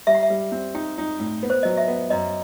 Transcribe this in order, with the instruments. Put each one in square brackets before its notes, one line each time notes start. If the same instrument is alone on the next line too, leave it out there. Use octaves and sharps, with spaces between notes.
[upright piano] G3 [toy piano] E5
[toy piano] F#5
E5
[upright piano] G3
C4
[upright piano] D#4 [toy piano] G5
[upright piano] D#4
A2
B3
[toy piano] C5
[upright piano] F#3 [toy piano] D#5
[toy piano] E5
[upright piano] B3
[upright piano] F#2 [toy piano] D#5